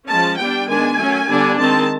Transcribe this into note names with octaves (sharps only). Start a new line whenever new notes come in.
F3 G#3 C#4 A5
G3 B3 D4 G5
D#3 G#3 B3 D4 G#5
F#3 A3 C#4
D3 G3 B3 D4
D#3 G#3 C4 A5